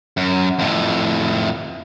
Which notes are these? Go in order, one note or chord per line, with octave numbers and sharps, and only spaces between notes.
F#2
F2 A2